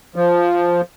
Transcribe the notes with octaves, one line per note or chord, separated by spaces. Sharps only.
F3